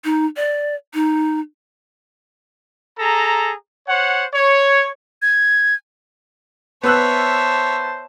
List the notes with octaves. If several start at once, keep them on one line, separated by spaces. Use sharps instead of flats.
D#4
D5
D#4
G#4 A4 A#5
C5 C#5 F#5
C#5
G#6
B3 C5 C#5 E5 A5 E6 F#6